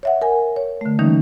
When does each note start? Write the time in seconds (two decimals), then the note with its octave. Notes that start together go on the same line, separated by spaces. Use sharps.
0.03 C#5 E5 F#5
0.22 A#4 G#5
0.56 C#5
0.81 D3 A3
0.99 D#3 E3 G3 A#3 C#4 D#4